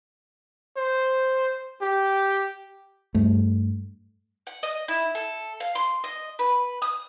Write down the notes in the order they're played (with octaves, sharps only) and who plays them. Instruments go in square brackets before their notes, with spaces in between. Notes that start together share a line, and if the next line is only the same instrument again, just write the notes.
[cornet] C5
G4
[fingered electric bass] G2 A3
[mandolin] F#5
D#5
E4
A4
F5
C6
D#5
B4
D#6